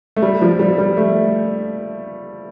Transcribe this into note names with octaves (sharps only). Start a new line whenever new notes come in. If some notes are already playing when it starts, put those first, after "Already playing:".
A3
G3
F3
G3
G3
A3